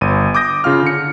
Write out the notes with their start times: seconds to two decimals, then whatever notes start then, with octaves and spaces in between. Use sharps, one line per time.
0.01 G1 D#7
0.34 D6 D#6 G6 A#6
0.64 C#3 F4 F5 F6
0.83 D3 C#7